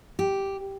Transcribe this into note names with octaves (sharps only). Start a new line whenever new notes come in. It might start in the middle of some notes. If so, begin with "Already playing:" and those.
G4